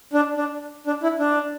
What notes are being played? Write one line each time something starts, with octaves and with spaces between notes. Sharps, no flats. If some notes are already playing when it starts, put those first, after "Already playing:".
D4
D4
D4
E4
D4